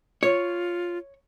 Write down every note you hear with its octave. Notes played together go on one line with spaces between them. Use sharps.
F4 C#5